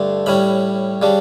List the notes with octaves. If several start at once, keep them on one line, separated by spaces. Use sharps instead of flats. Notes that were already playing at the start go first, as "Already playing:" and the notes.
Already playing: G2 D3 A3 D4
A2 G3 C#4 B5
C#3 G3 D4